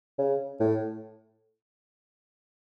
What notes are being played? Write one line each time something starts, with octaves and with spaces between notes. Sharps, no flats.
C#3
A2